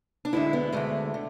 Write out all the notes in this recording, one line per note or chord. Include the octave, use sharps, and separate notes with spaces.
D4
D2 D3 G#3 E4
B3
D2 D3 G#3 A3
D3